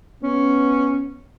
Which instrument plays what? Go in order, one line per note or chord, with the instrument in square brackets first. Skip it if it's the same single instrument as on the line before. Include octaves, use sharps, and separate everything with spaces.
[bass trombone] B3 [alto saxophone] C#4